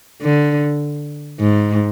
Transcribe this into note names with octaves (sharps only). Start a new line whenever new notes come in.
D3
G#2